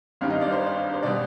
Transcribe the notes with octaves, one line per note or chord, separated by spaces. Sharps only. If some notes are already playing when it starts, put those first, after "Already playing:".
G#1 G2 D#3 G3 F5
D#5
D5
C5
C5
B2 G3 D5